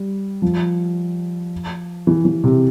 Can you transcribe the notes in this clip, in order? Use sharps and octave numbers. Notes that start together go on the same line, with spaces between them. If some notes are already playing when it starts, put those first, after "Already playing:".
Already playing: G3
F3
E3
E3
C3